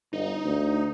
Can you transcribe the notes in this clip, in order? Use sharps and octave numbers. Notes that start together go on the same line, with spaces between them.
G1 D#4
D2